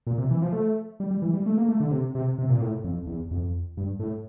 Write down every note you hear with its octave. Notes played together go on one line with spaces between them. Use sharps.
A#2
C3
E3
F3
A3
G3
G3
E3
G3
A3
A#3
A3
D3
C3
C3
C3
A#2
A2
F2
E2
F2
G2
A2